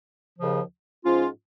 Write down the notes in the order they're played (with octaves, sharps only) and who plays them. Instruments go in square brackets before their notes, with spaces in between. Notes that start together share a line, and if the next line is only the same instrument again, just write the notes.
[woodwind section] D#2 C#3 F3
G#2 F3 C#4 F4